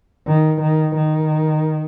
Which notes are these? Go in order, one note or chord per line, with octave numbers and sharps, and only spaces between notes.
D#3
D#3
D#3